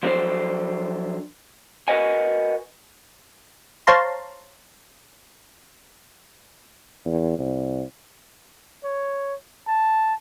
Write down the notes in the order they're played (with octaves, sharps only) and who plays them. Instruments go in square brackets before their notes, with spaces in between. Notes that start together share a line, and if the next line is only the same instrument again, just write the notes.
[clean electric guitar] F3 F#3 B3 D4 A4 C5
F#4 A#4 B4 D#5 F#5 G#5
[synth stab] C5 C#5 F5 A5 A#5 C6
[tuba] E2
C2
[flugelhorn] C#5
A5